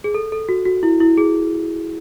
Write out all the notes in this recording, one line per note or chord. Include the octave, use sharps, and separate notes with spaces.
G#4
A4
A4
F#4
F#4
E4
E4
G#4